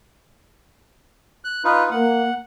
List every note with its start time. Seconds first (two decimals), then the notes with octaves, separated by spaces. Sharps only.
1.45 F#6
1.64 D#4 F4 B4
1.91 A#3 F#5